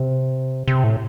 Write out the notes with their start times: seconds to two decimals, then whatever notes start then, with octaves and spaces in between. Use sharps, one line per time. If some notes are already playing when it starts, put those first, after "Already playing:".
Already playing: C3
0.68 C3
0.84 A2